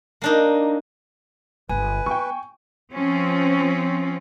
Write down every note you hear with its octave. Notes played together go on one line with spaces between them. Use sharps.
A#3 D4 D#4
G1 B4 G#5
B3 G5 C#6
F3 C4 C#4